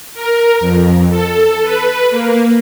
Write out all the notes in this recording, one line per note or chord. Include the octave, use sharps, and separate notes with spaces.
A#4
F2
A4
B4
A#3